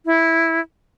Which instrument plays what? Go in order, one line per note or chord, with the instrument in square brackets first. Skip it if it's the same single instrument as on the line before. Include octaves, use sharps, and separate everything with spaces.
[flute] E4